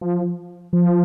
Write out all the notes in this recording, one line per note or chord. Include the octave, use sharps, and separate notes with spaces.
F3
F3